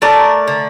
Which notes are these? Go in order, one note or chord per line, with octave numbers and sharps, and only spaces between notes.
A3 A#4 D5
D3